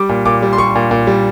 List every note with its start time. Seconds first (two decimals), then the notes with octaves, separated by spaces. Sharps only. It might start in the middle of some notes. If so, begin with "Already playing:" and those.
Already playing: G3 D6
0.09 A#2
0.26 A#2 D6
0.42 G3
0.53 C6
0.58 G3 C#6
0.75 A#2
0.91 A#2
1.07 G3